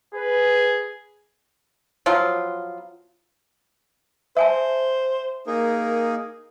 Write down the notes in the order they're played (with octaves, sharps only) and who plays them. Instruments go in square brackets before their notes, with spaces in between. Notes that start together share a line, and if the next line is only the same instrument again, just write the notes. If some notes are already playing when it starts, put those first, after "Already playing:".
[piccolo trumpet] G#4 [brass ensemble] B4
[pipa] F3 F#3 B3 F4
[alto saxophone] C5 [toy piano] E5 G#5 A5
[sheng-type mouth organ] A#3 D#4 G#4 [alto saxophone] A#4